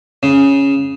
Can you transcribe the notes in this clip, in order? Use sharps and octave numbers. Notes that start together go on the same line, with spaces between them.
C#3